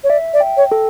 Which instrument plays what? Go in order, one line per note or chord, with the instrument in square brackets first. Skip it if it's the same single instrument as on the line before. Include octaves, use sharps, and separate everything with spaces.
[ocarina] C#5
[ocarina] D5 [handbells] E5
[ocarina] D5
[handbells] G5
[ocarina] C#5
[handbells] A4